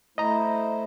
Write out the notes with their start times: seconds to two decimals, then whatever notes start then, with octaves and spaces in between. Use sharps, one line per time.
0.18 A3 E4 C5 D#5 A#5